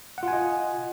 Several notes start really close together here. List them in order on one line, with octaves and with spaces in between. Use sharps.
F#5 F4 G#5 D#5